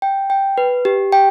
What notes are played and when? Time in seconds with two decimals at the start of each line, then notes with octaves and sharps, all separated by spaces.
0.02 G5
0.30 G5
0.58 B4
0.85 G4
1.12 G5